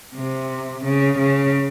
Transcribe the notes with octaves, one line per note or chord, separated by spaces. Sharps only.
C3
C#3
C#3